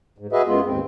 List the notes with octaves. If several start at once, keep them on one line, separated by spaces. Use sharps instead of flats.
G#2
F#4 G#4 B4 D#5 E5
F#2 G#3 B3 F4
D#2 G#2 C4